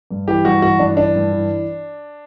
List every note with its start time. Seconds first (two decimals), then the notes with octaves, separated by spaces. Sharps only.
0.11 G2
0.28 E3 G4
0.45 G2 F#4
0.62 E3 F#4
0.79 G2 D4
0.97 E3 D4
1.15 G2
1.32 E3